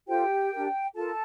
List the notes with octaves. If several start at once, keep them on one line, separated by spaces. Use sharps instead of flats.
F4 G4 A4 C5 G5
D4 G4 A#4
F4 A4 A#4 A5